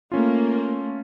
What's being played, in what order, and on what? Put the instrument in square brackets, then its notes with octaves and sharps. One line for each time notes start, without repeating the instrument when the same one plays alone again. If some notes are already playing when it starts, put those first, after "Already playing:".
[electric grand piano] A3 C#4 F4 [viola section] A#3